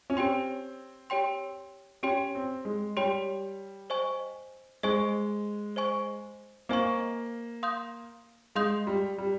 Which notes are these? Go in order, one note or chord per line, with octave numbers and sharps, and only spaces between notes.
C#4
C4 G4 C#5 G5 C6
G4 C#5 G5 C6
C#4 G4 C#5 G5 C6
C4
G#3
G3 G4 C#5 G5 C6
C5 D#5 G#5 C#6
G#3 C5 D#5 G#5 C#6
C5 D#5 G#5 C#6
A#3 C5 D#5 G#5 C#6
F5 C6 D#6 G6
G#3 F5 C6 D#6 G6
G3
G3